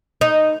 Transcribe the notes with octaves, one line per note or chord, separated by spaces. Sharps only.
D#4